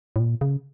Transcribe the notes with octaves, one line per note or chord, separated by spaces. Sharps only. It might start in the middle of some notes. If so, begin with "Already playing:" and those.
A2
A#2
C#3